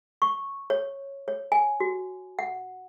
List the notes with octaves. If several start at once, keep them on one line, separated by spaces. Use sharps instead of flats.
C#6
C#5
C#5
G#5
F#4
F#5